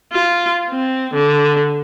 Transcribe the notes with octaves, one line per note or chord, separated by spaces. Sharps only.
F4
C4
D3